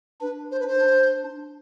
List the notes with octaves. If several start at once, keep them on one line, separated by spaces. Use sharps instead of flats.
D4 B4
C5
B4
C5
D4